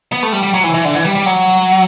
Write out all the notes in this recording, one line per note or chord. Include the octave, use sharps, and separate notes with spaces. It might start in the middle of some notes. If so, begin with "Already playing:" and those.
B3
A3
G3
G3
F#3
E3
E3
D3
E3
G3
G3
F#3